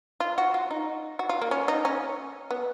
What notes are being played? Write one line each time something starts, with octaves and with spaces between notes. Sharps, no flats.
F4
F#4
F4
D#4
F#4
F4
A#3
C#4
D#4
C#4
B3